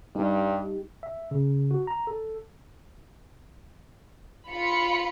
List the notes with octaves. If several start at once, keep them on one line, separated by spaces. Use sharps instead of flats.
G2 G3 D#4 G4
E5
C#3
F#4
A#5
A4
F4 B5 C#7